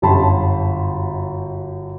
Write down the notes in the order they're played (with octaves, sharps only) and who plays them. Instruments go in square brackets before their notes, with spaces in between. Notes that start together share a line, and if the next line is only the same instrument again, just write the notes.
[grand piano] G1 F#2 G4 A5 B5 C6